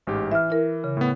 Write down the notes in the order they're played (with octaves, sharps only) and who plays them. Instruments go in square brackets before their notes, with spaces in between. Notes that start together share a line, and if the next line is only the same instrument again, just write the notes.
[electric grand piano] A1 G#2 G4
[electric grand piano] E3 [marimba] E5 F6
[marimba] E4 A#4
C#3
[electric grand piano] A2 B3